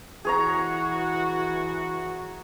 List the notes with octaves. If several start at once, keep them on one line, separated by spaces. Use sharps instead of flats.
E3 F#4 G#4 C#5 A#5